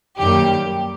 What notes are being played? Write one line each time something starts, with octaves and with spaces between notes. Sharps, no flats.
F#2 D#3 G3 A#3 G4